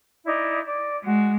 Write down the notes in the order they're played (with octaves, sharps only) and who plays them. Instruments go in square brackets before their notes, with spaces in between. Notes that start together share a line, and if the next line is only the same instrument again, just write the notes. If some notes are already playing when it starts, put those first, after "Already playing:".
[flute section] D#4 E4 D5
D5
[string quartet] G#3 [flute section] F#4